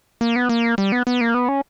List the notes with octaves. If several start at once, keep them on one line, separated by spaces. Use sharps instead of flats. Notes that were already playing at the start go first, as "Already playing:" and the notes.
A#3
B3
A#3
G3
B3
B3
A#3
B3
C#4